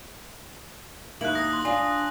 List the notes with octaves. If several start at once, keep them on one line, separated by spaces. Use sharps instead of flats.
D#2 A#3 E4 F#6 F#7
D#6 A#6
C6 F#6
D4 F4 G#5